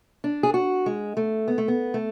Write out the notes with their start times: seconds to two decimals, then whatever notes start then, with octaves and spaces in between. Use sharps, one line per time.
0.24 D4
0.43 G#4
0.54 F#4
0.86 G#3
1.17 A3
1.48 B3
1.58 A3
1.68 B3
1.94 A3